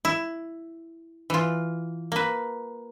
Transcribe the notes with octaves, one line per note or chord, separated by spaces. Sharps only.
E4
E3 F4
A#3 B4